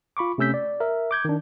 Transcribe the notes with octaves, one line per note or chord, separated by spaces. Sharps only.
F4 B5 C#6 D6
C3 A3 C#4 E6 G6 B6
D5
A#4 E5
D6 G6 G#6
D#3 D4